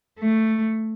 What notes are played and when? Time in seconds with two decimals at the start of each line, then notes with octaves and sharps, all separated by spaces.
0.19 A3